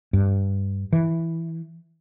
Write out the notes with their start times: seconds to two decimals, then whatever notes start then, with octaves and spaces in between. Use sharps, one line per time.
0.13 G2
0.93 E3